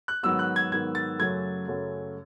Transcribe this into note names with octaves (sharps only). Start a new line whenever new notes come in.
F#6
G#2 D#3 F#3 B3 E6
F#6
G#6
G#2 D#3 F#3 B3 G#6
A6
F#2 C#3 F#3 A3 G#6
F#2 C#3 F#3 A3